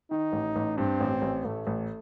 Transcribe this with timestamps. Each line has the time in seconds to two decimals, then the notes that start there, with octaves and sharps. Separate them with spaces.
0.11 D#3 D#4
0.33 A1
0.56 A1
0.77 G2 C4
1.01 A1
1.22 A1
1.45 A1 A3
1.67 A1